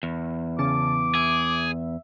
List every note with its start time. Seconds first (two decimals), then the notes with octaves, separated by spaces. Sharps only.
0.03 E2
0.59 C#3 A5 D6
1.15 G#4 E5